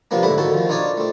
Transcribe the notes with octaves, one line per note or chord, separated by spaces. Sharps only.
C3 F3 A#3 B3 D4
G#2 D3 A3 E4 F#5 B5
D#3 E4 F#4 A4
D#3 F3
D4 D#4 F4 C#5 D5
A3 C4